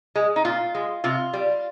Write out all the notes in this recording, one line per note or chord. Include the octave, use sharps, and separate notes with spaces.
G#3
D#4
A#2 F4
G#3
C3 F4
G3